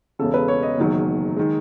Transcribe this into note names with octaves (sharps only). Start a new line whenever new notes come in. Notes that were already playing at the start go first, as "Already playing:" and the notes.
E1 E2 C#3 A4
B4
C#5
D#5
F#1 E2 D#3 F#3
D#3 G#3